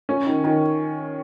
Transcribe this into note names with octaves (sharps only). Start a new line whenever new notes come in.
C#4
D#3
D#3